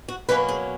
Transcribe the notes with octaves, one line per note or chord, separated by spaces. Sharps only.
F#4
B2 F#3 A#3 C#4 B4
G#4